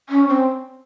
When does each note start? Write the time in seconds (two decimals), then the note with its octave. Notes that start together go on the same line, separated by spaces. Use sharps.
0.09 C#4
0.28 C4